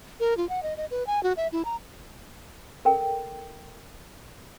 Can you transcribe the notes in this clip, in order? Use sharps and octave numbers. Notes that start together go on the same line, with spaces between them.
A#4
F4
F#5
D#5
D#5
B4
G#5
F#4
E5
E4
A#5
A4 A#4 G5